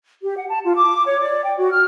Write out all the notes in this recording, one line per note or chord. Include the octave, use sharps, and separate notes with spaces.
G4
F#5
A5
F4
D6
C#5
D5
G5
F#4
F6